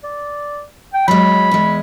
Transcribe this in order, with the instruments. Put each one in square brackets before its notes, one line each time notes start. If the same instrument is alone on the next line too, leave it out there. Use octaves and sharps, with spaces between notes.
[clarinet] D5
G5
[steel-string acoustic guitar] F#3 G#3 [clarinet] B5
[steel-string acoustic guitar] E2 G#3